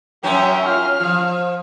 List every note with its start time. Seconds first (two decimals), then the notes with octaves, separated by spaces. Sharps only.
0.23 F#2 F#3 C#4 E5 G5
0.66 F4 F6
1.00 F3